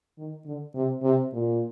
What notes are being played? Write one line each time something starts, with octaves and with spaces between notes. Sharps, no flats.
D#3
D3
C3
C3
A#2